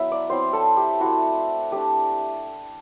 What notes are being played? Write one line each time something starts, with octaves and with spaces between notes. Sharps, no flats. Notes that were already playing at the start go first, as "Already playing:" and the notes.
Already playing: F#3 B3 E4 E5
D5
F#3 C4 E4 C5
A4
G4
A3 E4 F#4
A3 D4 G4